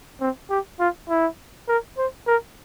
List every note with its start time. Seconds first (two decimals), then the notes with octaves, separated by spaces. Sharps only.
0.21 C4
0.50 G4
0.80 F4
1.09 E4
1.68 A#4
1.98 C5
2.27 A#4